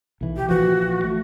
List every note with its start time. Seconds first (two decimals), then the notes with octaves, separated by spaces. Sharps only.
0.21 B1 E3
0.36 G4
0.49 A#1 E3 F3 F#4
1.04 A3